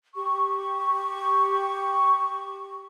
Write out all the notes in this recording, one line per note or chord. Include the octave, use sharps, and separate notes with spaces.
G4 C#6